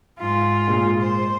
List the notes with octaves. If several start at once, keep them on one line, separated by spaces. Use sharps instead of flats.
G#2 F4
A#2 G#3
C5